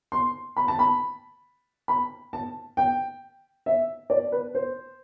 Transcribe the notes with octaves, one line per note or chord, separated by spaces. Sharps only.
C6
B5
A5
B5
B5
A5
G5
E5
D5
B4
C5